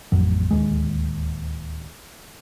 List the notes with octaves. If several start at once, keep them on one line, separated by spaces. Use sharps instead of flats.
A1 F2 F#3
D1 D#2 G#3